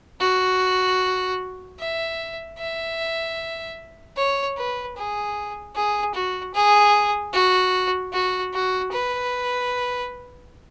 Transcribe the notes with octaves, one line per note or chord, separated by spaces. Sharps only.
F#4
E5
E5
C#5
B4
G#4
G#4
F#4
G#4
F#4
F#4
F#4
B4